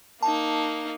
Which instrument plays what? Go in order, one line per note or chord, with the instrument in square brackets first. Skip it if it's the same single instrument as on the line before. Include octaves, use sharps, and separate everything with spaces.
[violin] A#3 D#4 [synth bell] A5